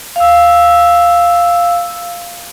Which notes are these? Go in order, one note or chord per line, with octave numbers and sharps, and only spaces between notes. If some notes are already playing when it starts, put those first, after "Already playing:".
F5 E6